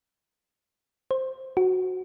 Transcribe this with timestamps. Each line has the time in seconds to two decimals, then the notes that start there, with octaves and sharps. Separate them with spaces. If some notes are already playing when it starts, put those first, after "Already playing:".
1.11 C5
1.57 F#4